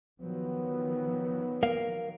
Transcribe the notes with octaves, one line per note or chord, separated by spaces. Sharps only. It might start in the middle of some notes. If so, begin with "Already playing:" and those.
D#3 F3 F#3 B3
A#4 F5